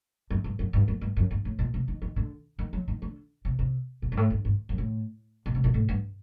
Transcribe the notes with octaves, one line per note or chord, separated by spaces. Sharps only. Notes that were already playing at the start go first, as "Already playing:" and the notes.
F#2
G2
F#2
G2
F#2
G2
F#2
G2
A2
A#2
C3
D#3
D#3
D3
D#3
F#3
D#3
D3
C3
C3
A#2
G2
A2
G2
G2
F#2
A2
A#2
C3
A#2
A2
G2